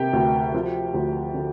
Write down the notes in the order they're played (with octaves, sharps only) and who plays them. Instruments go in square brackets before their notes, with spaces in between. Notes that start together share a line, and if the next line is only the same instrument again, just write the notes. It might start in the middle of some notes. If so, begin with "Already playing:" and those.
Already playing: [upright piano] C3 D#3 A#3 G4 G5
D2
F3
D2
D3